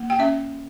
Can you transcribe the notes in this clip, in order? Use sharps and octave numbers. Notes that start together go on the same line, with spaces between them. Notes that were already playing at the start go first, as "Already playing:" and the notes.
Already playing: A#3
G5
C#4 E5